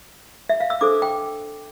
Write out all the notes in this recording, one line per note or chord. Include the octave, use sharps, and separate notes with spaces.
E5
F5
E6
D4 A4 C5 D6
G5